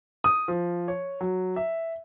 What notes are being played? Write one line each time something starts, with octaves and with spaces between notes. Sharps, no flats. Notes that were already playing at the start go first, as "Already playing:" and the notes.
D#6
F3
C#5
F#3
E5